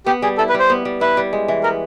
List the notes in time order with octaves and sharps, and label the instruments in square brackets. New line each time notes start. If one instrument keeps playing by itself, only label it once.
[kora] B3 [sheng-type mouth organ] G4
[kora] G3 [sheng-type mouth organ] G#4
[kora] E4 [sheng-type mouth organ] A4
[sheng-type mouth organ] B4
[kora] G3 [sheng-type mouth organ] C5
[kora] B3
G3
[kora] E4 [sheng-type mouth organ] B4
[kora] G3
G#3
E3
[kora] B3 [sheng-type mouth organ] A#4